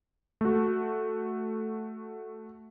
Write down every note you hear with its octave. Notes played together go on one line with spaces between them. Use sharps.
A3 F#4